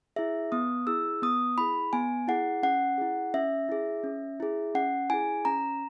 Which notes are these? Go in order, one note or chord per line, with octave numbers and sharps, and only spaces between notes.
E4 G#4 E5
B3 D#6
E4 G#4 E6
B3 D#6
E4 G#4 B5
B3 G#5
E4 G#4 F#5
C#4 F#5
E4 G#4
C#4 E5
E4 G#4
C#4
E4 G#4
C#4 F#5
E4 G#4 G#5
C#4 A#5